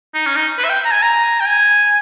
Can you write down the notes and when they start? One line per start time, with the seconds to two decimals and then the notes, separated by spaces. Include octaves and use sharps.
0.14 D#4
0.26 C#4
0.36 D#4
0.58 B4
0.64 E5
0.69 G5
0.85 A#5
0.91 G#5
1.02 A#5
1.40 G5
1.46 G#5